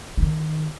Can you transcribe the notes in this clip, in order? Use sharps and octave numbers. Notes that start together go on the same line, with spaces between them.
E3
D#3